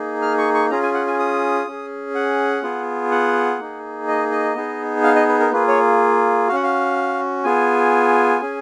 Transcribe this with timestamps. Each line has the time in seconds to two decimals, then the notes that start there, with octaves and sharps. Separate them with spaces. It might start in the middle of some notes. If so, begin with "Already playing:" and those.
Already playing: A#3 D#4 G#4
0.22 F6
0.38 C#6
0.54 C#6
0.70 C#4 F4 G#4 A#5
0.82 G#5
0.94 F#5
1.07 G#5
1.19 D#6
1.67 C#4 G#4
2.15 F#5
2.63 B3 F4 G#4
3.11 F#5
3.59 A#3 D#4 G#4
4.08 D#5
4.31 D#5
4.56 B3 D#4 G#4
5.04 F5
5.16 D#5
5.28 B4
5.40 A#4
5.52 A#3 F4 G#4 B4
5.68 C#5
6.48 F#4 F5
6.52 C#4 F#5
6.63 F5
7.44 B3 F4 G#4 G#5
8.41 C#4 G#4